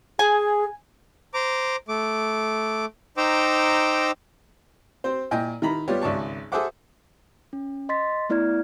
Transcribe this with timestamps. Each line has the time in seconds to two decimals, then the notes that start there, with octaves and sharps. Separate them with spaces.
0.19 G#4 G#5
1.34 C5 A#5 D6
1.88 A3 D6
3.17 D#4 C5 G5 A#5 D6 E6
5.04 C4 C5
5.31 A#2 E4 D#5 G5 G#5
5.62 D#3 E4 A#5 B5
5.88 G3 B3 F4 G4 C#5 D5
6.02 G#1 C#2 D5 E5 A5 C#6
6.52 G#4 A4 C5 E5 F#5 D6
7.53 C#4
7.89 D#5 C6 A6 B6
8.29 A3 B3 E4 D5 F6 G#6